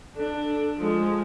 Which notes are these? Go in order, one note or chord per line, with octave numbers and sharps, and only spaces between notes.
D4 A4
F3 G#3